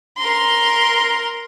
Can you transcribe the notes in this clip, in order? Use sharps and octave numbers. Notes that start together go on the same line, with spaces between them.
A#4 C6